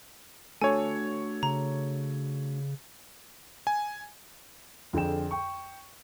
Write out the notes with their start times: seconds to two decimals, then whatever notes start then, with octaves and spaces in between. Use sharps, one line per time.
0.62 A3 D4 F#4 A4 C#5 G#5
1.43 C#3 A#5
3.67 G#5
4.93 F2 D3 G#4 G5 E7
5.31 G5 C#6